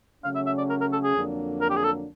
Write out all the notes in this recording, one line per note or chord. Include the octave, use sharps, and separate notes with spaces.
C#3 F#3 A3 C#4 F5
E5
E5
D5
A#4
A#4
A4
G#4
F2 D3 F#3 A#3 D4
A#4
G4
G#4
A4